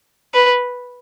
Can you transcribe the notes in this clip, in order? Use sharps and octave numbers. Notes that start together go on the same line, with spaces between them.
B4